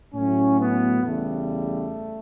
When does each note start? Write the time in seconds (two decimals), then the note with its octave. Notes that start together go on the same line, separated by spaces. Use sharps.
0.14 A2 F#3 C#4
0.59 B3
1.03 E2 C#3 G3 A3